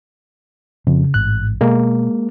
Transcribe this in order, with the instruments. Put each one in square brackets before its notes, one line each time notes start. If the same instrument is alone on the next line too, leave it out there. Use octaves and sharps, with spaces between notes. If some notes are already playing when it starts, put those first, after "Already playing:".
[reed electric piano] F2 [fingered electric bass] C#3
[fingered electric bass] A1 G#2 [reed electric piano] F#6
[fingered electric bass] B2 [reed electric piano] G#3 A#3